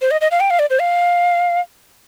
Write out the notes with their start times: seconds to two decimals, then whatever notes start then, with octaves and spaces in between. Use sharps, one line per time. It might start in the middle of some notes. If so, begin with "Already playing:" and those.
0.01 C5
0.11 D#5
0.21 D#5
0.31 F5
0.40 G5
0.50 F5
0.59 D5
0.70 C5
0.79 F5